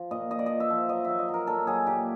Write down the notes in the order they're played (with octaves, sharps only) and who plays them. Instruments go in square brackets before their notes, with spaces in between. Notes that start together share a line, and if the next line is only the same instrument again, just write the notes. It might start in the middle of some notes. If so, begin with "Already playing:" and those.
Already playing: [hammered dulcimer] F3
A#2 D#5
A#2 D#5
D5
F3 D#5
E5
F3
F#3 D#5
F#3 E5
D#5
F#3
A#4
A#2 A4
F#3 G#4
A#2 G4